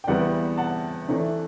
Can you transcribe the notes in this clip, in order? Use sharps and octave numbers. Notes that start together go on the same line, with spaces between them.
G5
E2 C3 E3 G3 B3 D5 F#5
F#5 A5
C3 E3 A3 D4